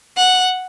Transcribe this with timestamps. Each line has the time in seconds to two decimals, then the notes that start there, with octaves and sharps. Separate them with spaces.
0.17 F#5